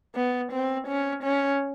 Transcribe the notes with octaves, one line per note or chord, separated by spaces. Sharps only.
B3
C4
C#4
C#4